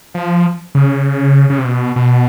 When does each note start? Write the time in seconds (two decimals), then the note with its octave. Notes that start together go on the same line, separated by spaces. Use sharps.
0.14 F3
0.75 C#3
1.50 C#3
1.58 C3
1.65 B2
1.96 B2